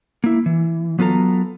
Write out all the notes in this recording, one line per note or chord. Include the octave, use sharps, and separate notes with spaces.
A#3 E4
E3
F#3 B3 F4 A4 A#5